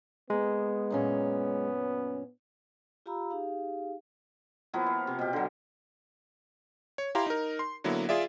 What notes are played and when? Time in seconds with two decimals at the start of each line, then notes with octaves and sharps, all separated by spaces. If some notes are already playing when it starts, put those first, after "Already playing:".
0.30 G#3 A#3 B3
0.90 F#2 A#2 C#4
3.06 F4 G4 F5 A#5 B5 E6
3.30 D#4 G4 G#4 F5
4.73 F3 A#3 B3 E4
4.86 F5
5.07 C3
5.19 B2 G4
5.33 D3 F#3
6.98 C#5
7.15 E4 G4 F5 A#5 C6
7.26 D#4 A#4
7.59 C6
7.84 D3 F#3 A#3 B3 E4
8.09 F4 G#4 D5 E5